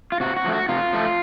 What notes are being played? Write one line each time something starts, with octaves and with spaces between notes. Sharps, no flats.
F4
C3 F#4
F#4
F3 A3
F#4
C3 F4
F3 A3